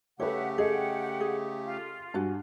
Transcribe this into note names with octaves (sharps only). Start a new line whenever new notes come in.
C#3 A3 G4 A4 B4 C#5 E5 F#5
G#4 A4 D#5 F#5 G5
G#4
F4
G2 F#4 G#5